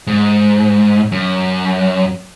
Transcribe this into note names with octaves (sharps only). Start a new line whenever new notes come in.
G#2
F#2